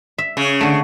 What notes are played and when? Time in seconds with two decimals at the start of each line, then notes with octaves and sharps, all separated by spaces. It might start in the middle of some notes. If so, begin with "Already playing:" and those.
0.18 E5
0.37 C#3
0.61 D3 A3